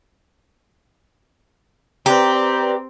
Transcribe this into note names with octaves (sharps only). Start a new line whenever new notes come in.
C4 G4 B4 D5 A#5